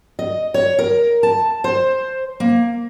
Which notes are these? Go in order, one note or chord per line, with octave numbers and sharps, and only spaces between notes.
D#5
C#5
A#4
A5
C5
A#3